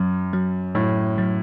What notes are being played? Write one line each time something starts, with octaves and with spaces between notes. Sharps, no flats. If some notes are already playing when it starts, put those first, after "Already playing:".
Already playing: F#2 F#3
F#3
A2 F#3
F#3